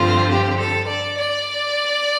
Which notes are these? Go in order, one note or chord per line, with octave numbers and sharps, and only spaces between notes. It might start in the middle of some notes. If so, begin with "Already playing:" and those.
Already playing: G2 D3 F3 C4 F4
G4
A4
D5
D5